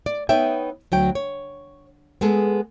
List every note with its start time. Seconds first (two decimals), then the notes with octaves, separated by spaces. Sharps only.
0.06 D5
0.29 B3 D#4 C#5 E5 G5
0.92 D2 F#3 G5
1.15 C#5
2.21 G#3 B3 G#4 A4